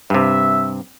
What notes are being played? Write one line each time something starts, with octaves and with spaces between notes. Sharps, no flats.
G2 C3 E5